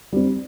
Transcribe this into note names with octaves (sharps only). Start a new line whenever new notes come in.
G3 C4